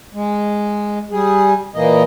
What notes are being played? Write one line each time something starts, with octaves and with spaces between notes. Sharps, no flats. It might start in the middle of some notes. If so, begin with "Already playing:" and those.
G#3
G3 G#4
A#2 E3 A#3 D#5